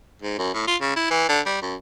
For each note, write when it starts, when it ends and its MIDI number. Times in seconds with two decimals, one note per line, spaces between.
0.22 0.37 44
0.38 0.54 42
0.54 0.67 45
0.68 0.76 65
0.81 0.92 49
0.96 1.10 64
1.11 1.25 52
1.29 1.41 50
1.46 1.57 55
1.62 1.75 42